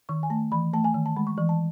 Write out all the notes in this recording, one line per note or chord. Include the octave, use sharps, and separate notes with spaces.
D#3 C#6
G#5
A3 A5
E3 B5
A3 A5
G#5
D#3
A5
G#3 B5
C#6
E3 C#6
A5